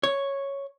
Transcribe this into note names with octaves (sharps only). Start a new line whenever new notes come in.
C#5